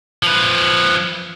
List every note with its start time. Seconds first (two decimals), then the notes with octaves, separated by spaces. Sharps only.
0.23 F3 B4